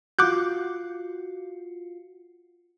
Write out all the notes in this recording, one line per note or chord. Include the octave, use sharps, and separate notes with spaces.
F4 F#4 D6 F#6 G6